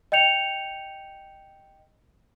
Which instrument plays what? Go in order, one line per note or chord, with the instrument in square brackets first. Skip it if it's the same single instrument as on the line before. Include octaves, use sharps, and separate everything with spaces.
[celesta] D#5 G5 G6 C#7 F7